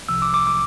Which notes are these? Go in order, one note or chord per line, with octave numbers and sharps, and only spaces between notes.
C2 C3 F3 E6
D6
D6
D6